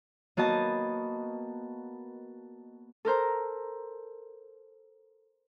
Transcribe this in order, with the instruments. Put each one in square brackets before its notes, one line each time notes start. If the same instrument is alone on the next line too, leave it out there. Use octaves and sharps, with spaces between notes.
[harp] A#3 B3 F#4 D#5 A5
A4 A#4 C5 A#5